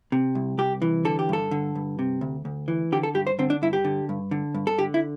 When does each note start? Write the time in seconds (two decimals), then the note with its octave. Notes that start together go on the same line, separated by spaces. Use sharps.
0.12 C3
0.35 C2
0.58 C2 G4
0.82 E3
1.05 D3 A4
1.19 G4
1.29 G2 A4
1.51 D3
1.76 G2
1.99 C3
2.21 D2
2.45 D2
2.68 E3
2.92 D3 G4
3.03 A4
3.14 G2 G4
3.27 C5
3.39 D3 C4
3.50 D4
3.62 G2 E4
3.73 G4
3.84 D3
4.09 G2
4.31 D3
4.54 G2
4.67 A4
4.78 D3 G4
4.94 E4